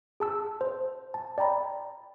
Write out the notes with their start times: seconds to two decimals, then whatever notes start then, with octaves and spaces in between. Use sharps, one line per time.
0.20 G#4 A5 E6
0.61 C5
1.14 A5
1.38 D5 G5 A#5 B5